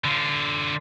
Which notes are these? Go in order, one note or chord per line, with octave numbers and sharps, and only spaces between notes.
D3 F4